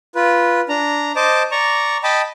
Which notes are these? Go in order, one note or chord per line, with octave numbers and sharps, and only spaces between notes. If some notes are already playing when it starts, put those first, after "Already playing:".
F4 B4
D4 A#5
C5 D#5 A5 D6
D5 A#5 C#6
D#5 G5 A5 B5